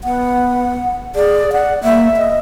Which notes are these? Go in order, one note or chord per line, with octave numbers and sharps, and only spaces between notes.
B3 F#5
G#4 D5
D5 F#5
A#3 E5
D#5